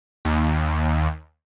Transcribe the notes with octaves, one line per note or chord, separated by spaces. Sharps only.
D#2